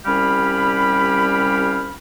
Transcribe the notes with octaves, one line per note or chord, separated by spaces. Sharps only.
C2 G3 C#4 G4 F5 B5